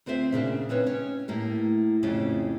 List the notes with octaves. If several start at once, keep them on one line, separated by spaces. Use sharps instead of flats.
D2 C4 F4 C5 E5
A#2 C#3 D4 F5
C4 C#4 D#4 B4 C#5
C#4
A2 A#3 G4
F2 A2 C#3 C#4 F4 G4